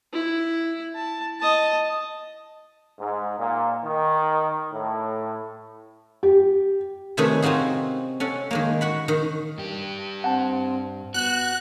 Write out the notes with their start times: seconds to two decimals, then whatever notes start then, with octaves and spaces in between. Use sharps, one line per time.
0.13 E4
0.95 A5
1.40 D#5 A5
2.99 G#2
3.39 A#2
3.84 D#3
4.72 A2
6.23 G4
7.17 C3 D#3 A3 C#4 G#4 B4
7.42 C4 D#4 F4 F#4 G#4
8.20 C#4 A4 F#5
8.51 D#3 G#3 A#3
8.81 F#4 F#5 B5
9.08 D#3
9.58 G2 G4
10.24 C4 F#5 A5
11.14 B3 F#4 F#6